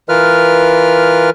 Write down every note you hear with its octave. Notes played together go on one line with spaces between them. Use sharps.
E3 F4 A#4 B4 F6